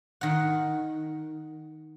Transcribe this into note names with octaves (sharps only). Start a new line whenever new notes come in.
D#3 F#5